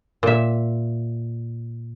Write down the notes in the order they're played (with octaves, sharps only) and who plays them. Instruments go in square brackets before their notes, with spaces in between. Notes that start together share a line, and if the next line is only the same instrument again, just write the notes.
[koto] A#2 E5